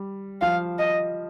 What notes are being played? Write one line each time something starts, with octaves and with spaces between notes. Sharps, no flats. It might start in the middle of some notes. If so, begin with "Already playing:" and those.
Already playing: G3
F3 F5
D#5